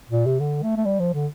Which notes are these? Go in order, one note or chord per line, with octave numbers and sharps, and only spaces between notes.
A#2
C3
D3
A3
A3
G3
F3
D3